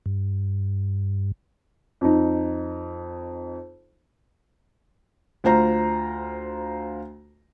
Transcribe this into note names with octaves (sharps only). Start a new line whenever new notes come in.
G2
F2 D#4
D2 F4 C5 A#5